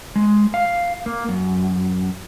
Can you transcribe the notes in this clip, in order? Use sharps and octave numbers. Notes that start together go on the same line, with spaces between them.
G#3
F5
A#3
F#2